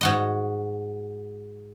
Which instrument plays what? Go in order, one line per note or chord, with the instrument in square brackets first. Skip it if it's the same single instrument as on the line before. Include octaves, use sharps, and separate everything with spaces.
[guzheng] G#2 F#4 D#5